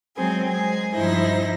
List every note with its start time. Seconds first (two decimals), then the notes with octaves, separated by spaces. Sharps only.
0.16 F#3 G#3 C4 G#4
0.48 G#3 G#4
0.94 G2 F3 D#4 E4 C5 A#6